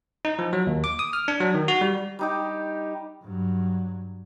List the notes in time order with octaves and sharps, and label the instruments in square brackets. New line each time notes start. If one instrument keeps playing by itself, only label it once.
[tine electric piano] D#4
F3
F#3
D#2
D6
D#6
F6
D4
F#3
D#3
F#4
G3
[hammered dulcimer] G3 D#4 G4
[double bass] G2 F#3